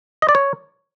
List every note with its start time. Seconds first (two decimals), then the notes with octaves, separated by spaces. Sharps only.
0.22 D#5
0.29 D5
0.35 C#5